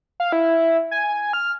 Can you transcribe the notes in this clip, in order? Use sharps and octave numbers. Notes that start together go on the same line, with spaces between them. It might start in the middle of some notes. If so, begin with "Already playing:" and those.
F5
E4
G#5
F6